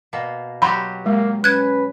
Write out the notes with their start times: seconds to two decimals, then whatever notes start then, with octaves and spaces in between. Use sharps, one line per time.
0.13 B2 A#3
0.62 F#3 F#4 G4 B5 C6
1.06 G#3 A#3
1.44 C#4 B4 F#6 G#6